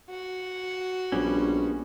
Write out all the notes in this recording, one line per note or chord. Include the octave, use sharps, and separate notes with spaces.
F#4
A#1 G3 B3 C#4